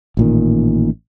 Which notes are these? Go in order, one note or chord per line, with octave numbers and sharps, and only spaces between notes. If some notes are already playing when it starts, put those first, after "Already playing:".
A1 A#2 D#3